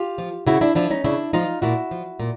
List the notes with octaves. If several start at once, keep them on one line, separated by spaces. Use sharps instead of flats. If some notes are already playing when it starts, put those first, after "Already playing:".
Already playing: F4 G4
F3
C#3 E4 F#4
D4 E4
F3 D4 E4
C#4 D#4
C#3 D4 E4
F3 D#4 F4
A#2 E4 F#4
F3
A#2